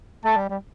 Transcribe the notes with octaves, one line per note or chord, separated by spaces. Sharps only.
A3 A5
G3
G3